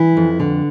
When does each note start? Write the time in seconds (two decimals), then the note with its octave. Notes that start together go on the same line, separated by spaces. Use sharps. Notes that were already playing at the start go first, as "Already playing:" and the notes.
Already playing: E3 E4
0.17 F2
0.40 D3